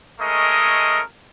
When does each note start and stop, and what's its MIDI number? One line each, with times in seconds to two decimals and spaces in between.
0.21 1.01 56
0.21 1.01 57
0.21 1.01 61
0.21 1.01 70
0.21 1.01 75